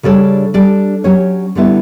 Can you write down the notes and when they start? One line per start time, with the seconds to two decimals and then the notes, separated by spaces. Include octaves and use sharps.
0.03 C#3 G3 D4 A4 C#5
0.54 G3 D4 A4 D5
1.04 F#3 C#4 G4 C#5
1.55 D3 G3 B3 E4